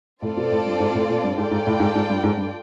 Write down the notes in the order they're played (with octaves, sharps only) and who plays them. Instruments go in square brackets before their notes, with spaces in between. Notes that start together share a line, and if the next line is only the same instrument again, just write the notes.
[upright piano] A2 [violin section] C4 F4 A4 D5
[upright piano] B2
A2
G2
G#2
A2
A#2
G2
[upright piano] G#2 [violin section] F4 A4 D5 G5
[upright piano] G#2
A2
G#2
G#2
G2
G#2
G2